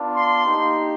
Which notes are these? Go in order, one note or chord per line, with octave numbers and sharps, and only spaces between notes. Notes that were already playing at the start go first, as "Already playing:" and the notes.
Already playing: B3 D4 F4
C6
A#3 D#4 G4